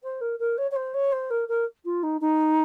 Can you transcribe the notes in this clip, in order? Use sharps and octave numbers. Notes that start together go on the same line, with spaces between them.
C5
A#4
A#4
C#5
C#5
C5
C#5
C5
A#4
A#4
F4
D#4
D#4